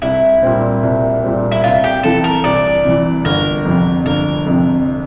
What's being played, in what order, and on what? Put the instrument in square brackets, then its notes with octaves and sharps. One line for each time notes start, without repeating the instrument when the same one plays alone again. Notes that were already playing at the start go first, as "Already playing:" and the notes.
[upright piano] C2 [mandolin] E4
[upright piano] A#2 G3 C4
C2
A#2 G3 C4
[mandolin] E4
[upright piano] C2 [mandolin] F4
[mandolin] G4
[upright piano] C3 E3 [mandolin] A4
[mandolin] A#4
[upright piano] C2 [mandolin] D5
[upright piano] C3 E3
[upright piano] G1 [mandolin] A#4
[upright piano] F2 C3
[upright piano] G1 [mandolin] A#4
[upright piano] F2 C3